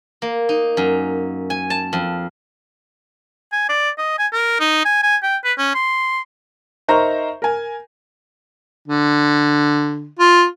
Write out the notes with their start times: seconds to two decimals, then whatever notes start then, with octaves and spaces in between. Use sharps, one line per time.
0.22 A#3
0.49 D#4
0.77 F#2
1.50 G#5
1.70 A5
1.93 F2
3.52 G#5
3.69 D5
3.98 D#5
4.18 G#5
4.33 A#4
4.60 D#4
4.85 G#5
5.03 G#5
5.23 G5
5.44 B4
5.58 C#4
5.75 C6
6.88 D#4 A#4 C5 E5 A#5 C#6
7.42 A#4 G#5
8.88 D3
10.19 F4